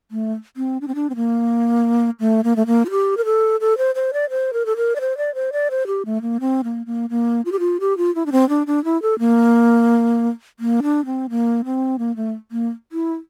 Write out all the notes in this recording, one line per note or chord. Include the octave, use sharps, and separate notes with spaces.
A3
C4
D4
C4
D4
C4
A#3
A3
A#3
A3
A#3
F4
G4
A#4
A4
A4
C5
C5
D5
C5
A#4
A4
A#4
D5
C5
D5
C5
D5
C5
G4
A3
A#3
C4
A#3
A#3
A#3
F4
G4
F4
G4
F4
E4
D4
C4
D4
D4
E4
A4
A#3
A#3
D4
C4
A#3
C4
A#3
A3
A#3
E4